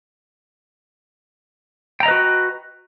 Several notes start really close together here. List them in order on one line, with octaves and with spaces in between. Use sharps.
G5 A#5 D#5 B4 F#4